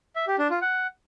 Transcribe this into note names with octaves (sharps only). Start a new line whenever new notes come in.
E5
G4
D4
F4
F#5